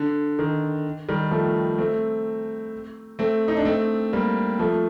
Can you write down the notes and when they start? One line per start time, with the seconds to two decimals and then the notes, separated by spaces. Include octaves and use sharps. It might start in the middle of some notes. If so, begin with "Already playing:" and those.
Already playing: D3
0.39 D#3
1.08 D#3 G3
1.31 F3 A3
1.78 A3 C4
3.19 A3 C4
3.48 D#4
3.57 D4
3.65 A3 C4
4.13 G3 A#3
4.59 F3 A3